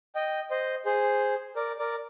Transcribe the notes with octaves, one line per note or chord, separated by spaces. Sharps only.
D#5 G5
C5 D#5
G#4 C5
A#4 D5
A#4 D5